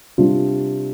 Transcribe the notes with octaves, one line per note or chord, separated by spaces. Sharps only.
C3 G3 D4 F4